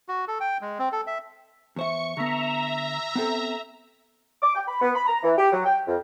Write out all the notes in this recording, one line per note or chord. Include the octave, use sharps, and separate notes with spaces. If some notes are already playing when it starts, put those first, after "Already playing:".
F#4
A4
G5
G#3
C4
A4
E5
E2 C5 E5 C#6 C#7
D3 B3 E5 A#5
B3 C4 A4
D6
G5
B5
B3
B5
A#5
E3
G4
F#3
G5
F2